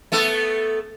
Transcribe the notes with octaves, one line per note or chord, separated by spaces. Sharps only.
A3 B3 A4